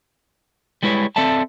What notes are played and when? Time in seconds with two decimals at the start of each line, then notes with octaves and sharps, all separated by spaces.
0.83 G3 G#3 E4 B4 C#5
1.16 C4 A4 D5 E5 A5